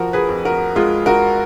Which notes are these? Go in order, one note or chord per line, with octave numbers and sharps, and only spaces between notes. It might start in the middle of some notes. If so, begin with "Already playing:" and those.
Already playing: F3 F#4 A#4
G#4 B4
F2
F#4 A#4
G#3 F4 G#4
F#4 A#4